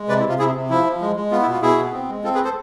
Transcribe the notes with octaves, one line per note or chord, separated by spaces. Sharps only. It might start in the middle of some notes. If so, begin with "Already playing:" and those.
Already playing: G#3
C3 B4 D5
E4
C3 F4
C3 E4 G#4
C3
F3 E4
F3
G#3
G#3
B3 F4
E4
B2
F4
B2 E4 G#4
B3
C4
G#3
C4 F4 A4
G#4 B4
A4 C5